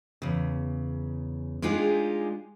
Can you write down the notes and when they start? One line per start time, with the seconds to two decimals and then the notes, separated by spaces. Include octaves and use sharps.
0.22 E2 C#3
1.62 G#3 D4 D#4 F4 G4 G#4